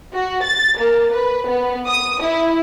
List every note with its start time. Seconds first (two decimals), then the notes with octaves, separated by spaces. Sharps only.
0.15 F#4
0.44 A6
0.78 A#3
1.13 B4
1.48 B3
1.88 D#6
2.22 E4